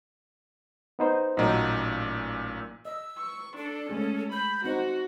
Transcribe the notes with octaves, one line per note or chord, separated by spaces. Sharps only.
B3 D#4 C5
A1 A#2 F#3 D#4
D#5 E6
C#6
D4 A4
G#3 A3 C#4 G#4
B5 G6
C4 D#4 F#4 C5 F#5